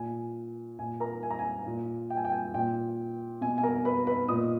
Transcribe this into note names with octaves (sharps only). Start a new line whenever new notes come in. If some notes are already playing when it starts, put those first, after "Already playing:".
Already playing: A#2 G#5
A#2 G#5
A#4 A#5
G#5
A#5
G#5
A#2
G5
G#5
G5
G#5
A#2 G5
B2 G#5
G#5
A#4 A#5
B4 B5
B4 B5
A#2 D#5 D#6